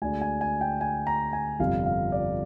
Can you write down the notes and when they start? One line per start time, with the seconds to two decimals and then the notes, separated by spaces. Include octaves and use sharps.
0.02 D2 D3 G#3 G#5
0.21 G#5
0.41 G#5
0.61 G5
0.81 G#5
1.07 A#5
1.33 G#5
1.59 G1 F2 C3 G3 F5
1.86 F5
2.12 D5